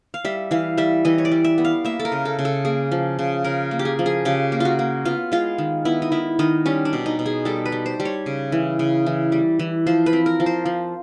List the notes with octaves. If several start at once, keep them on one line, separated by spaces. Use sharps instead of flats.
F5
G3 E5
E3 F5
G3 E5
E3 D#5
C#5
D5
G3
E5
B3
F5
A#3 E5
A4
A#4
C#3
A4
C#3
A4
A#3 G#4
F3
C#3
C#3 A#4
A#3
G4
G#4
F3
G#4
C#3 G4
A#3
F4 F#4
A#3
B3 F4
G#3 F4
D#3
B3 E4
D#4
D#3 E4
D#3 D#4
G3 C#4
D4
B2
D#4
B2
G#4
G3 A4
B4
G3
C5
G3
C#5
C#3
E3
C#3
E3
G3
E3
F3 C5
B4
C4
A#4
F3
C5
F3